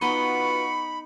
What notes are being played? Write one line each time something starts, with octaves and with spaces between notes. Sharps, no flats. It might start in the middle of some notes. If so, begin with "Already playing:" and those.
B3 D#4 F4 F#4 B4 D#5 B5 C#6